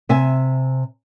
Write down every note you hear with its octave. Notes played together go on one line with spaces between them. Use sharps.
C3 E5 G#5